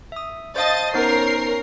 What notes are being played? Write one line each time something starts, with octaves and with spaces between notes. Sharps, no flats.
E5 D#6
C5 D#5 F5 A5 A6
B3 C#4 D#4 A#4 C5 C7